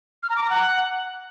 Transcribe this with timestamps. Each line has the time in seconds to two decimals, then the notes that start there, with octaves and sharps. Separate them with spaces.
0.23 F6
0.30 A#5
0.36 D6
0.43 A#5
0.50 F#5